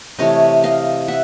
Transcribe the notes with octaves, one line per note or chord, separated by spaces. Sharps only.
C3 E3 A3 C#5 D#5
D#5 F5
E5 F#5